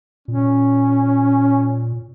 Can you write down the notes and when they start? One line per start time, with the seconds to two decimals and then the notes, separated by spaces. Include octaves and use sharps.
0.28 A#2 C#4